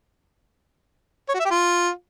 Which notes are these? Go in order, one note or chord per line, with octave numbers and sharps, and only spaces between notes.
C#5
F#4
E5
G4
F4